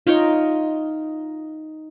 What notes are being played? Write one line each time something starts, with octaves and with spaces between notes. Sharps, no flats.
D#4 F4 C#5 D#5 G5